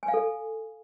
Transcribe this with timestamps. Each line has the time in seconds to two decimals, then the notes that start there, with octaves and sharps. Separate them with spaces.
0.03 G#5
0.08 F5
0.14 A4